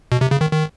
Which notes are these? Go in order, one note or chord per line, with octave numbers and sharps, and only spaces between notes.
B2
C3
C#3
D#3
D#3